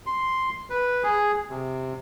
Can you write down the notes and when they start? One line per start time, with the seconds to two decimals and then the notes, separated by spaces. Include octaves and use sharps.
0.06 C6
0.70 B4
1.03 G#4
1.50 C3